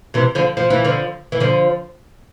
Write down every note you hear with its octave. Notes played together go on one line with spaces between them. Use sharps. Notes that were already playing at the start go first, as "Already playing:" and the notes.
C3 E3
D3 F3
F3
E3
D3 F3
E3
D3 F3